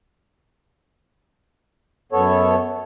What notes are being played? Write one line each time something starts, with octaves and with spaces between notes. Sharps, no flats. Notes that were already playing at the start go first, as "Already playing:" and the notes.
F#2 B3 A4 C#5